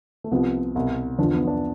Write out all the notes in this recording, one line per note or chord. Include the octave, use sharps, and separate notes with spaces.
A3
C2 C3 F3 B3
C2 B2
E2 D3 F3 D4
B3
D4